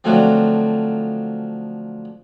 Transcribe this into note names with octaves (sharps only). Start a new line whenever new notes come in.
D3 F3 F#3 A3 C4